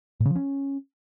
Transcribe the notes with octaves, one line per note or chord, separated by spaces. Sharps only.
A2
C#3
F3
C#4